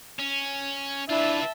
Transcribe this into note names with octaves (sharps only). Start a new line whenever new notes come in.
C#4
D4 E4 F4 B4 E5 A5